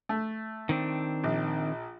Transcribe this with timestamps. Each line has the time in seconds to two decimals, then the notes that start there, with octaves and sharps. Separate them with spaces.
0.09 A3
0.69 D#3 C4 D4
1.24 A#1